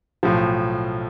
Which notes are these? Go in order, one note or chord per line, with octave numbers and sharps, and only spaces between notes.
B1 A2 F3